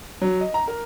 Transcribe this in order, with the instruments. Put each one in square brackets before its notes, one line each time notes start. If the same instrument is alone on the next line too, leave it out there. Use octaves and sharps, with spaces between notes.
[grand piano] F#3
D#5
A#5
A#4